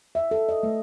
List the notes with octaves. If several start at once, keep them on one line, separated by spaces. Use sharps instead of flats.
E5
A4
D#5
A3